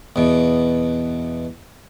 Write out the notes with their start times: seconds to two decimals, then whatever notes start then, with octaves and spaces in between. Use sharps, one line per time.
0.16 E2 B2